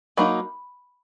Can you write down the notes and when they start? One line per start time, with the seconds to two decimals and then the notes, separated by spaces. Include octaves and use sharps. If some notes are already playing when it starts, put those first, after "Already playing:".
0.17 F#3 A#3 D#4 B5